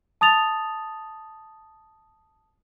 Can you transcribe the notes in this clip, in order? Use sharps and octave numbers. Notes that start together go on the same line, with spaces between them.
A5 D#6 A6 F7